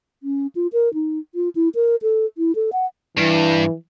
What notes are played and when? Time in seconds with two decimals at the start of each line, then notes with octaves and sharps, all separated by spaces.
0.23 C#4
0.55 F4
0.73 A#4
0.94 D#4
1.35 F4
1.55 E4
1.75 A#4
2.02 A4
2.38 E4
2.55 A4
2.73 F#5
3.17 G2 E3